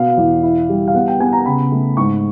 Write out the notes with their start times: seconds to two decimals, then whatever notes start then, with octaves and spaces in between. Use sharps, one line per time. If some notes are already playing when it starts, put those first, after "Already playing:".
Already playing: B2 B3 F5
0.17 E2
0.43 E4
0.69 G3
0.88 F5
0.94 B3 F#5
1.08 G5
1.20 B3 G#5
1.33 A#5
1.46 C#3 B5
1.72 A3
1.97 G#2 C#6